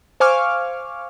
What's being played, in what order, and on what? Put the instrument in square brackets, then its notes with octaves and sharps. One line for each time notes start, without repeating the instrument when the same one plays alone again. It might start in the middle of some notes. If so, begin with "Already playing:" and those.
[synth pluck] C5 F5 G#5 C#6 D6 F6